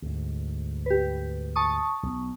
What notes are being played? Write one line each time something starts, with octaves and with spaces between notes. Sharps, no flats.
D2 G#2
G4 B4
A5 C#6 D#6
B1